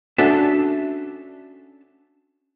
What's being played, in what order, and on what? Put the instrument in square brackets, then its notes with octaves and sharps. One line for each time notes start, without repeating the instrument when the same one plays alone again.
[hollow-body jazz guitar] C#4 D4 F#4 A4 E5 A5